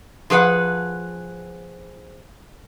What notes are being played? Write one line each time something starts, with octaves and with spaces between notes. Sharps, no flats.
F3 G#4 B4 F#5